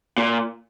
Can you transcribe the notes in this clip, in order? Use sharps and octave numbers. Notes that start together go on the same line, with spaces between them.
A#2